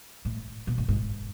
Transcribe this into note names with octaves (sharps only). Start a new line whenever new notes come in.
A2
A#2
A2
G#2